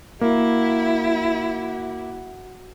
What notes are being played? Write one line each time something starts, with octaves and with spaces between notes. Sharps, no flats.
A#3 E4 F#4